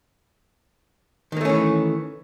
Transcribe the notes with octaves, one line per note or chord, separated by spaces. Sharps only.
D#3 E3 A3 A#3 C#4